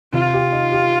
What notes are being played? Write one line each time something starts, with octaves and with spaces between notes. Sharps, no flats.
C3 F4
G4
D#4
G4